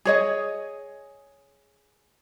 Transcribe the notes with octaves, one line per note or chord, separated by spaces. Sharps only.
G#4 C#5 D#5